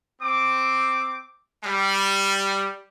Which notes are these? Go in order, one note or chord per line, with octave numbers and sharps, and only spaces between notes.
C4 D6
G3